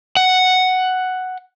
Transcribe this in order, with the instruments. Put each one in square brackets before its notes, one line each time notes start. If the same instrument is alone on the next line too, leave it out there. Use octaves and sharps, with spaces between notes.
[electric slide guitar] F#5